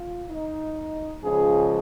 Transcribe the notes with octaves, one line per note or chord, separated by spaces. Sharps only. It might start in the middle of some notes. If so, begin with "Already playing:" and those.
Already playing: F4
D#4
C#2 C#3 F3 G#4